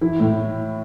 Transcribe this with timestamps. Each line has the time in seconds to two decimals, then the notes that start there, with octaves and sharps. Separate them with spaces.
0.01 E3 E4
0.20 A2